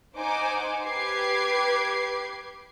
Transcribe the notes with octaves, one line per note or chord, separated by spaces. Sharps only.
D#4 C5 F#5 G#5 D6
G4 B4 D6 G#6 C7